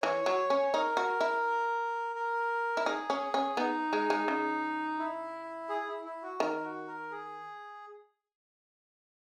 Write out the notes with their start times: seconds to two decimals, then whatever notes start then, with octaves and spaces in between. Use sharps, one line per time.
0.03 E3 C#5
0.26 F#3
0.50 C#4
0.74 D#4 A#4
0.97 F#4
1.21 E4
2.16 A#4
2.77 E4
2.86 D#4 G#4
3.10 C#4
3.34 C#4
3.57 B3 D#4
3.93 G#3
4.10 G#3
4.28 C#3
4.99 E4
5.69 G#4
5.88 E4
6.05 E4
6.23 F#4
6.40 D#3 A#4
6.64 F#4
6.87 A#4
7.11 G#4